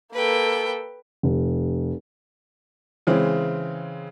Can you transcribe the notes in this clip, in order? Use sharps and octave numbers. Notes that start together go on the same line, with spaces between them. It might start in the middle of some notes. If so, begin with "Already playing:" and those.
A#3 A4 B4 G5
F1
C#3 E3 G#3 C4